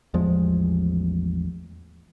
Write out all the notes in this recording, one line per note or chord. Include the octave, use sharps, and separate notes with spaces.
A1 E2 F3 G#3